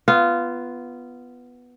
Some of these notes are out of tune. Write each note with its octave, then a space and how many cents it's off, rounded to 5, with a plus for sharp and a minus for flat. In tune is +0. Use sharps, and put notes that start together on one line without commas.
B3 +0 F4 -15